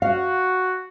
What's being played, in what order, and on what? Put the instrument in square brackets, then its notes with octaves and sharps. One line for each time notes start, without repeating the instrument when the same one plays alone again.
[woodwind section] F#4 [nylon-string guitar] F5